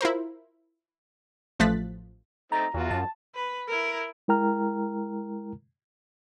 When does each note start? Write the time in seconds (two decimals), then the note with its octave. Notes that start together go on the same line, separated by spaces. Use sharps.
0.01 E4 F4 A#4 C5
1.60 A1 F3 A3 F#6 A6 B6
2.52 A3 C4 D#4 A#5
2.74 E2 F4 F#4
2.91 F#2 A5
3.35 B4
3.68 E4 A#4
4.28 G#3 E4 A#4 G5 A#5 F6